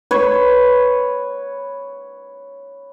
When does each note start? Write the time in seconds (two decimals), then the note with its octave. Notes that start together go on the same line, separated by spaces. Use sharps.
0.11 B4 C#5